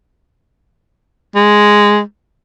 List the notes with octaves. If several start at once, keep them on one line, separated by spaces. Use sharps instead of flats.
G#3